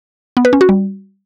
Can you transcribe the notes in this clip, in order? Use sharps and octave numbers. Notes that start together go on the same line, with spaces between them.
B3
B4
C#4
F#4
G3